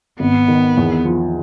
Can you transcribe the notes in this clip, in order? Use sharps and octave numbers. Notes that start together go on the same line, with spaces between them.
G#1 B3
D#3
E2
F3